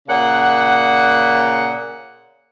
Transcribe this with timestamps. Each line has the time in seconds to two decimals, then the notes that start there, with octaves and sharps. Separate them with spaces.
0.09 A#2 C#3 F#5